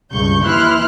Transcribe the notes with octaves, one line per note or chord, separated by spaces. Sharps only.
C#2 G2 C#6 G6
D#2 E3 E4 C6 F6 F#6